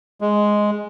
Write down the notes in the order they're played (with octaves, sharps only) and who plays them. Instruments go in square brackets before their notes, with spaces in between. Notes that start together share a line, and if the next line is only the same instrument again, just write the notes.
[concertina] G#3